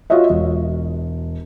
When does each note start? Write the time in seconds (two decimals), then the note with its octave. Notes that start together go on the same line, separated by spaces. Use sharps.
0.10 F4 F#4 C#5 D#5 E5
0.30 E1